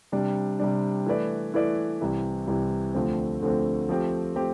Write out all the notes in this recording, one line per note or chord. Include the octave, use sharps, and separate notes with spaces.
C3 G3 D4
C3 G3 D4
E3 A3 E4 B4 D5
E3 A3 E4 B4 D5
C2 C3 E3
C2 C3 E3
D2 D3 F3 A3 C4
D2 D3 F3 A3 C4
F3 A3 C4 G4
F3 A3 C4 G4